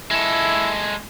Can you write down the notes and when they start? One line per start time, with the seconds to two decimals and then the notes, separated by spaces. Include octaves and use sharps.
0.11 G#3 E4 A4